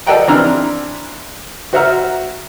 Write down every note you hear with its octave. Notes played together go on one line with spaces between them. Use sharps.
A4 D5 D#5 F#5 G5 A#5
E3 C4 D4 A#5 E6 F6
F#4 C5 E5 F#5 A#5 F6